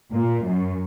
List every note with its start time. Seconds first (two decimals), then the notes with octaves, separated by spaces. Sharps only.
0.12 A#2
0.44 F#2